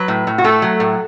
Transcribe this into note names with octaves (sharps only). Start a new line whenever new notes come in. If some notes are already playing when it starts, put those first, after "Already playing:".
Already playing: F#3 B4
A2
A2
F#4
A3 A4
F#3
A2